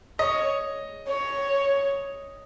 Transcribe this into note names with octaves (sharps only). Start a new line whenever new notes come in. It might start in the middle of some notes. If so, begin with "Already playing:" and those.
C#5 D#5
C#5